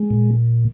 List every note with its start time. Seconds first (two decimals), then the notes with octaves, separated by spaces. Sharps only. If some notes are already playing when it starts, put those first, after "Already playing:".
Already playing: G#3
0.10 A#2